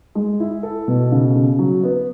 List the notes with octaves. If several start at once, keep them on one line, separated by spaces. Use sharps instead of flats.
G#3
E4
A4
B2
C#3
C#3
F#3
B3